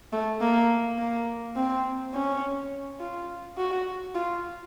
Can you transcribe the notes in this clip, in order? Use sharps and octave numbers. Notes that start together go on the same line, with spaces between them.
A3
A#3
A#3
C4
C#4
F4
F#4
F4